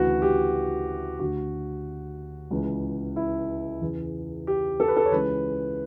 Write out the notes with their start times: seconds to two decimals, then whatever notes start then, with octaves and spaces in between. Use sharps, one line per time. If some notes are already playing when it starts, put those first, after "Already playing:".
Already playing: D2 C#3 E3 F#4
0.22 G4
1.19 D2 D3 F#4
2.51 C#2 C#3 E3
3.16 E4
3.81 E2 C#3 E3
4.47 G4
4.80 A4
4.88 B4
4.97 A4
5.05 C#5
5.12 C#2 C#3 E3 B4